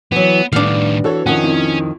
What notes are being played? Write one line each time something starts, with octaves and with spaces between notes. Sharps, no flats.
E3 F#3 B3
A2 D#3 G3 B3 D4 F5
E3 F#4 A4 C#5
F2 D#3 C#4 F#5
C2